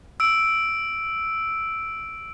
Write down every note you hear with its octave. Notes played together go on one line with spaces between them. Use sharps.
E6 D7